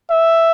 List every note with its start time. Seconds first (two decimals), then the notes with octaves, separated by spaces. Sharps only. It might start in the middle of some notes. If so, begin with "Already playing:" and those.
0.11 E5